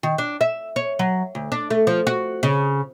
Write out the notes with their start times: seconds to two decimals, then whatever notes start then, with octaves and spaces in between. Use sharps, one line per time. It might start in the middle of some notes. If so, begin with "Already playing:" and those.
0.03 D#3
0.18 D4
0.41 E5
0.76 C#5
0.99 F#3
1.35 D2
1.52 D4
1.70 A3
1.87 F3
2.07 F#4
2.43 C#3